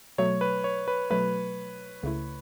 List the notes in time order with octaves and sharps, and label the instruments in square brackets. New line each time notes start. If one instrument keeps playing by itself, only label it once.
[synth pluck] B2 F#3 A3 [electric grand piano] C#5
[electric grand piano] B4
C#5
B4
[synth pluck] B2 F#3 A3 [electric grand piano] B4
[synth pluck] C#2 C#3 A3 E4